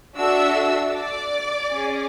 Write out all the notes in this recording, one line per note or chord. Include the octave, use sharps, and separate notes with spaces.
D4 F#4 A4 E5 E6
D5 D6
C#4 G#4